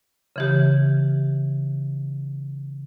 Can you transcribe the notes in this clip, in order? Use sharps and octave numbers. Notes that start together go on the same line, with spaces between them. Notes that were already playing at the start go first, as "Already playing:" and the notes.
C#3 E3 G4